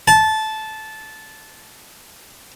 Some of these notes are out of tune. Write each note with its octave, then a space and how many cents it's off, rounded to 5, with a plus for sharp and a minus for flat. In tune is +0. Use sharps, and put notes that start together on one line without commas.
A5 -15